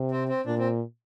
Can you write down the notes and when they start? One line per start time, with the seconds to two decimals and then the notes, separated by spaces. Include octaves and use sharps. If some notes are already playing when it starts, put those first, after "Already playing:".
Already playing: C3
0.11 C4
0.29 C4
0.46 A#2 D4
0.59 C4